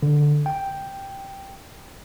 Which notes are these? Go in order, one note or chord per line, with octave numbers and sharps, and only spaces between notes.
D3
G5